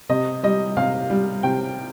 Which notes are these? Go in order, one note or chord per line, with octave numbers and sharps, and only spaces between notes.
C3 D#5
G3 D#5
C3 F5
G3
C3 G5